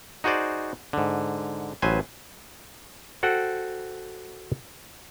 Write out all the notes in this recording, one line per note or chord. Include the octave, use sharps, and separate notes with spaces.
D#4 F#4 G#4 C5 D5
G#2 D3
A1 F#3 B4 C5 G#5
F#4 A4 C5 F#5 G5